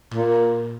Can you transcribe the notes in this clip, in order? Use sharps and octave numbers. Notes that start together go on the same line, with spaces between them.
A#2